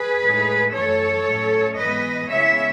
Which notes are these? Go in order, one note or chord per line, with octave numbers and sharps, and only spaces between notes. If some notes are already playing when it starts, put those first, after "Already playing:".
Already playing: G#4 B4
A2 G#3 D#4
F#2 E3 A3 A4 C#5
A2 F#3 A3 C#4
G#2 E3 B3 B4 D#5
C#3 G#3 B3 E4 C#5 E5